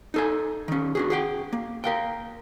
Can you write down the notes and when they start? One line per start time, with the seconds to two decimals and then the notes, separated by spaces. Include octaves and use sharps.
0.14 D#4 A4 G#5
0.68 D#3 C#4
0.95 D4 F#4 G#4
1.10 G#4 F#5 G5
1.52 A#3
1.84 A#4 F5 G5